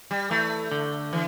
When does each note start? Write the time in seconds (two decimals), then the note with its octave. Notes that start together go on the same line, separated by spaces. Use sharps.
0.11 G3
0.31 E3 A3
0.72 D3
1.13 E3